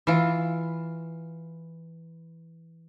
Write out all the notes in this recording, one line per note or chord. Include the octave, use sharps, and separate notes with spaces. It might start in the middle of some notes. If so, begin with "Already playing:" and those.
E3 F4